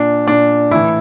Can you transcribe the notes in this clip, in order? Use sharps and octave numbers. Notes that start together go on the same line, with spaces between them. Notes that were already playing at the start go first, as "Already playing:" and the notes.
Already playing: A#2 D4
A#2 D4
A2 E3 E4